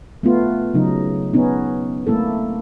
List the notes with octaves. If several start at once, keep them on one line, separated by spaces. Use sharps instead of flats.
A3 B3 F4
C#3 F#3 D#4
B3 C#4 D#4
A3 A#3 E4 A4